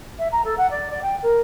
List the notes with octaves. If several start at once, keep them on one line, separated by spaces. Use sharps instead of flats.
E5
A#5
A4
F#5
D5
D5
G5
A#4